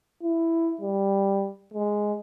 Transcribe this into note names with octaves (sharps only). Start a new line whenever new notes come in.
E4
G3
G#3